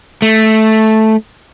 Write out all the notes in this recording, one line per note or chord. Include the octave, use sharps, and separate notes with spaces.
A3